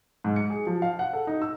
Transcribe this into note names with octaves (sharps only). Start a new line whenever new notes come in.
G#2
C#7
G#4
F3
F5
F#5
A4
D#4
E6